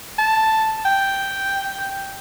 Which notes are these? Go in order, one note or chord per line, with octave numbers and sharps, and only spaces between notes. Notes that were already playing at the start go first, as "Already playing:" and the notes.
A5
G5